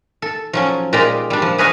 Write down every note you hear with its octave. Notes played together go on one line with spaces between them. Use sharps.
A4
F3 F#3 C#4
A#2 G#3 G4 D5 A#5 C6
G3 D4
F3
G#4 B4 C#5 D#5 F5 G#5